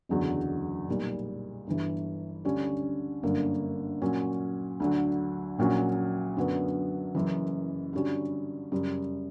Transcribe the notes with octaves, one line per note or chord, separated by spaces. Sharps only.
F#1 E2 D3 F#3
B1 A#2 G3
G1 G2 E3
D2 D3 G3 C#4
G1 F#2 D3 A#3
A#2 F#3 C#4
D2 D3 F#3
A#1 A#2 F#3 C#4
F#2 D3 F#3 B3
F#1 F#2 E3
G2 D3 G3 C#4 F#4
F#2 C#3 G3